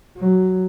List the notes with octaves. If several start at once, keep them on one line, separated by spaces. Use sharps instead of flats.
F#3